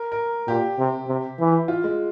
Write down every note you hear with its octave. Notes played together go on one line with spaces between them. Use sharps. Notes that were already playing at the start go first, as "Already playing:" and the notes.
Already playing: A#4
A#4
A#2 G4
C3
C3
E3
F4
G#3